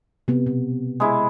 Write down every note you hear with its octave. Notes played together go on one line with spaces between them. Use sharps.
C3 B3
B2
G#3 E4